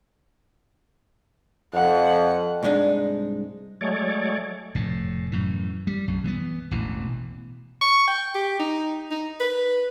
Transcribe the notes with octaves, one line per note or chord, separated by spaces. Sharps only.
F2 F#5
C2 G#2 G#3 D4 D#4
F#3 G#3 A3 C#5 D5
F1 A2
F#2 A2 E3
G3
B1 F#2
E3 A#3 B3
E1 A1 B2 E3
C#6
G5
G4
D#4
D#4
B4